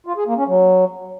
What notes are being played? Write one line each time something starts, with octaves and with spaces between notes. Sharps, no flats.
F4
G#4
A#3
C#4
F#3